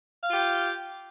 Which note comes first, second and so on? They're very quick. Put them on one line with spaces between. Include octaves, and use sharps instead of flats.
F5 F4 G4